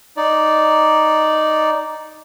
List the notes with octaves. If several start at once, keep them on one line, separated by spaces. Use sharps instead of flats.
D#4 D5